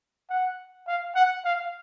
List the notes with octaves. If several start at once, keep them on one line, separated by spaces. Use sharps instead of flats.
F#5
F5
F#5
F5